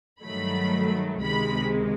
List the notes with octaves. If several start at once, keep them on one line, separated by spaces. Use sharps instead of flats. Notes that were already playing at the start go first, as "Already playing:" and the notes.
G2 D#3 F#3 A3 B5
C#2 C3 D#3 G#3 B5